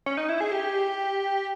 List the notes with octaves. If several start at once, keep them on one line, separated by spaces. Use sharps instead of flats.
C#4
D#4
E4
G#4
G4